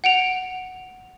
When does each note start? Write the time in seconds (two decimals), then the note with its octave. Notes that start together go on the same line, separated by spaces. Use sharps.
0.04 F#5 D7 F7